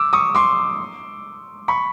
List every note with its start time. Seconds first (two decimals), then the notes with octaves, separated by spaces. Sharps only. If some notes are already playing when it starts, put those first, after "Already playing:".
Already playing: D6 E6
0.13 C#6 D#6
0.35 C6 D6
1.68 B5 C#6